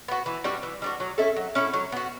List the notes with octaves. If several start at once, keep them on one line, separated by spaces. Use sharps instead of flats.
B3 F#4
E3
G3 D4 F#4
E3
G3 D4 F#4
F#3
C#4 E4 A4
F#3
C#4 E4 A4
F#3
B3 F#4